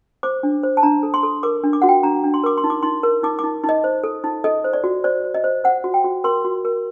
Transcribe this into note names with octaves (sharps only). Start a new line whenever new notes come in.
C5 D6
D4
C5
A5
D4 A#5
A4
C6
A4
A#4 D6
D4
D6
F#4 F#5
G5
D4 A#5
D4
C6
A#4 D6
C6
D#4
D6
D#4 C6
A#4
D#4 D6
D6
D#4
D#4
D#5
C5
A4
D#4
A4 D#5
C5
D5
F#4
C5 D5
C5
D#5
C5
C5 F#5
F#4
G5
F#4
A#4 C6
F#4
A#4